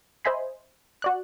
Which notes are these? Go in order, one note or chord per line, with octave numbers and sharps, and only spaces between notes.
C5 D#5 E5 G#5 B5 C6
F#4 D5 F#6